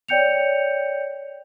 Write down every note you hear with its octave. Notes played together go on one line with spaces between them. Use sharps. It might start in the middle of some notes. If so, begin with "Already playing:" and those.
C#5 D5 G5 G6 C#7 F7